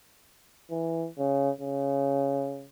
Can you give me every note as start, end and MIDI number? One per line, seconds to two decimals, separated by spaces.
0.71 1.07 52
1.19 1.50 49
1.61 2.68 49